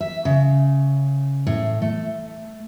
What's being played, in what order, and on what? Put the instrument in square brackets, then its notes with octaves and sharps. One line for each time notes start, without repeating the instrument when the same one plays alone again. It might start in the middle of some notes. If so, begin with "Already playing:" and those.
[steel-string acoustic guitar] E5
C#3
A2
A3